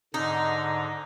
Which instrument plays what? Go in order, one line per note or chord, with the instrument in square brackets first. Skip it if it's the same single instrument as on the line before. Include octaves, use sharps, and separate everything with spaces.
[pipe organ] G#2 D3 A#5 [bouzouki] D#4